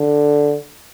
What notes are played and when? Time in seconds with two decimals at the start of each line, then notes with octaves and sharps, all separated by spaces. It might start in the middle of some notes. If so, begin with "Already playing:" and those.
Already playing: D3